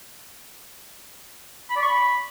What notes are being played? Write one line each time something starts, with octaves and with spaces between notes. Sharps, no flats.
B5
D5
C#6
B5